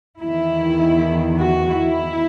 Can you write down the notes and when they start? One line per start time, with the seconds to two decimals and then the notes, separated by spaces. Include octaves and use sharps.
0.22 E2 D#3 E4
1.40 F#4
1.69 E4